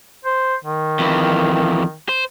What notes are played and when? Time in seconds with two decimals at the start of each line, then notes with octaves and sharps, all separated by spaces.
0.25 C5
0.64 D#3
0.99 F2 E3
2.09 C5